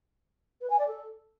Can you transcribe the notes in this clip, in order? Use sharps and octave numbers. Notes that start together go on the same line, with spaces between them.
B4
G#5
D5
A4